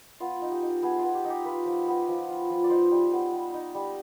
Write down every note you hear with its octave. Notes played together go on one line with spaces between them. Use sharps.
B3 F4
D#4
G4
D#4
B3 G#4
B3 F4
G4
D#4
G4
F4 B4
F3
B3
F3
F4
F3
D5
D#4 C5
G3
B3
G3
D#4
G3